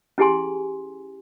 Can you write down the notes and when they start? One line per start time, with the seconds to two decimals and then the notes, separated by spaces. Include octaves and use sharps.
0.18 C#4 E4 G4 G#4 G#5 C6